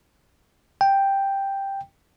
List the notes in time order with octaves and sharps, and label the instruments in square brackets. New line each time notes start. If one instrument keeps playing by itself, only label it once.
[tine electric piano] G5